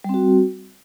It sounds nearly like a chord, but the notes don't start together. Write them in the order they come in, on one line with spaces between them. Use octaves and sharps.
G3 C4 F#4